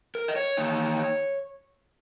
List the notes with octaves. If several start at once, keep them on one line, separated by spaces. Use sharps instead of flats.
A#4
D#5
C#5
D#3 A#3 D#4